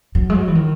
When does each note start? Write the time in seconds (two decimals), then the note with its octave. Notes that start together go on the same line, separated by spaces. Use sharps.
0.15 F#3
0.30 G#3
0.34 F#3
0.48 E3
0.55 D#3